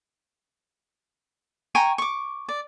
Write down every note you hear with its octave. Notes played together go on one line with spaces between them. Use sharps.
G5 G#5 A#5 C#6
C#6 D6
D5